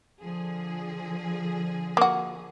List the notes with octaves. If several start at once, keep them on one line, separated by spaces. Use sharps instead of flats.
D3 F3 G#4
A#3 F#4